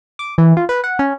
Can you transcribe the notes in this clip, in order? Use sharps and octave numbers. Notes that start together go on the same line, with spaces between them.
D6
E3
F4
B4
F#5
C#4